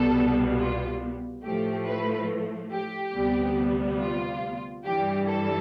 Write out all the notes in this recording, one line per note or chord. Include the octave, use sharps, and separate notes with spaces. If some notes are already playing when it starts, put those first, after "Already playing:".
Already playing: C2 B2 G3 B3 A4
F4
A2 F3 A3 G4
B4
G4
D2 C3 G3 B3
F4
G2 E3 G3 G4
A4